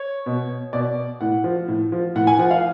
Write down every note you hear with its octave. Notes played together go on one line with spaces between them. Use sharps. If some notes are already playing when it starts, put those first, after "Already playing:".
Already playing: C#5
B2
B2 D5
A2 F#5
F3
A2
F3
A2 F#5
G#5
F3 F#5
F5